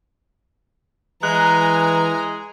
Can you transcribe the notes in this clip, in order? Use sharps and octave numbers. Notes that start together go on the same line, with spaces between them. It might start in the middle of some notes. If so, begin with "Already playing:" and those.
E3 G#3 G#5 A#5 F#6